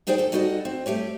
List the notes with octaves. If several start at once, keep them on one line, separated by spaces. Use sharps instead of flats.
B3 D#4 G#4 C5 D5 G5
D#2 A4
G3 D#4 F#4 A4 D#5
C4
G3 A3 G4 C#5